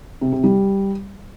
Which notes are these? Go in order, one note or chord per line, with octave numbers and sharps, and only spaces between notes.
C3
C3
G3